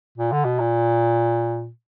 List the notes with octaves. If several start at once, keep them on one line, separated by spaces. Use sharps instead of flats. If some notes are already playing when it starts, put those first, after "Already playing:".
A#2
D3
B2
A#2